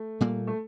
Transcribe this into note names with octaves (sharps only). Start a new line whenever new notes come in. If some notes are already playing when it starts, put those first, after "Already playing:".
Already playing: A3
A#2 G3 A#3
A3